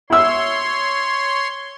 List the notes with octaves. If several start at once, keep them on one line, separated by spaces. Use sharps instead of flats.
E4 C#5 C6 E6